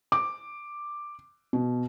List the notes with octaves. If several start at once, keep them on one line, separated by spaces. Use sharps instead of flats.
D6
B2